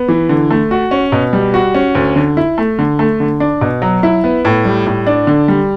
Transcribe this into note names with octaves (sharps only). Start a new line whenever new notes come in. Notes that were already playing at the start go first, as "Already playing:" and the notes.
Already playing: B3
E3
D3
A3
F#4
C#4
B2
G3
F#4
C#4
D2
D3
E4
A3
D3
A3
D3
D4
B2
F#3
E4
B3
A2
G3
A2
D4
D3
G3